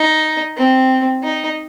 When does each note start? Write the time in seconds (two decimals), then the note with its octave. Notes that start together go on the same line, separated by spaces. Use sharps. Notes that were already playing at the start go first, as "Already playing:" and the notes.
Already playing: D#4
0.57 C4
1.23 D#4